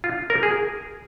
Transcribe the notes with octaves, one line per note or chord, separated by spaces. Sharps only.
F4
A#4
G#4